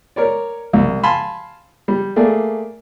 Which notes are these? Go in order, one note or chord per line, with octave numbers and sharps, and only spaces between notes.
A#4 C#5 D5
C2
F5 G#5 A5 B5 C6
G3
A3 A#3 G#4 D5